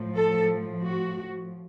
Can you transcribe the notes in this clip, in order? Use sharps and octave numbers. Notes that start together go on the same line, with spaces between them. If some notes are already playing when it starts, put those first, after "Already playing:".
Already playing: A2 F3
A4
F#4